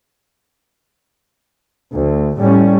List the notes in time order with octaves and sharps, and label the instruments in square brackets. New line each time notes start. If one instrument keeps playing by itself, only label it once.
[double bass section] D2
A2 G3 C#4